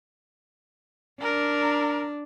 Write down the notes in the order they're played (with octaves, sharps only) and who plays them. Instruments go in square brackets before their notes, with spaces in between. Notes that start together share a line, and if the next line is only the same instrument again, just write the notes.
[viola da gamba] D4 [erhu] A#4